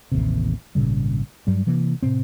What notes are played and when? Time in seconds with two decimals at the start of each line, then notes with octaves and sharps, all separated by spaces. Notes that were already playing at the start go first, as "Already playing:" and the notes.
0.12 A1 D#2 C3
0.75 G#1 A#2 C#3 G3
1.47 G2 F#3 G3
1.67 C3 E3 A#3
2.03 A2 C3 C4